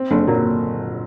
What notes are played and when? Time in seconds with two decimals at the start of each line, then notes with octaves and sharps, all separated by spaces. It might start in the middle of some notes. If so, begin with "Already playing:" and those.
Already playing: C4
0.11 F#1 D3
0.27 A#2 F#3